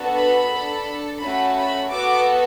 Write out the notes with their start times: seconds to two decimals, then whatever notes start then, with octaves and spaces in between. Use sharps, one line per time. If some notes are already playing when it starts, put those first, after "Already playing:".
Already playing: B3 D4 F#4 A4
0.14 B5
0.49 D4 A4
1.20 A3 C#4 F#4 A4 B5
1.55 B5
1.90 B3 F#4 A4 D6